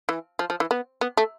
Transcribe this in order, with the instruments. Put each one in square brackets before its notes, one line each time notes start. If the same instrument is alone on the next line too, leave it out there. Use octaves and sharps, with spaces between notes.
[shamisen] E3
F3
F3
E3
B3
B3
A3